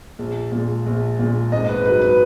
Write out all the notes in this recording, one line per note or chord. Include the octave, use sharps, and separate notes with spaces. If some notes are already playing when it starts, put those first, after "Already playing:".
A#1
A#2 G#3
A#1
A#2 G#3
G#1 D#5
B4
G#2 F#3 B4
B4